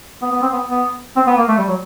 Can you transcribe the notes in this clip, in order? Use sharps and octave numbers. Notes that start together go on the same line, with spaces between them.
B3
B3
C4
B3
B3
C4
B3
A#3
A3
G3
F#3